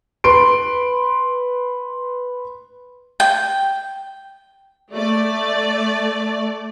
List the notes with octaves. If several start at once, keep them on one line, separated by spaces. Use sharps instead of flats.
B4 C6 D7
G5
A3 D5